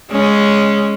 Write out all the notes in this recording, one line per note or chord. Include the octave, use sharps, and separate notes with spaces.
G#3 C#4